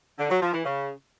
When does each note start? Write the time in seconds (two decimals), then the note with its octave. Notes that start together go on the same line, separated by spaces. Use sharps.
0.19 D3
0.30 F#3
0.42 F3
0.53 E3
0.65 C#3